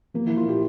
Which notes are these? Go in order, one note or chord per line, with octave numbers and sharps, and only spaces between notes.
F3 A#3
E4
F3
F4
A#2 G4